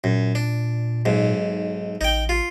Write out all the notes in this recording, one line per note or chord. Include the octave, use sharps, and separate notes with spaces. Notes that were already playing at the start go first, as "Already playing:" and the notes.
F#2 A#2
D4
B1 G#2
A1 D#4 G5
F4